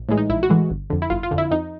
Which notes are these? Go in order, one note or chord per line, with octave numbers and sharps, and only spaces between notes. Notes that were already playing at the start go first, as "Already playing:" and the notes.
Already playing: A#1
A2 E3 G#3
D#4
A#1 E4
F#4
A2 E3 G#3
G1
F2 D3
E4
G1 F4
F4
F2 D3
E4
F2 D#4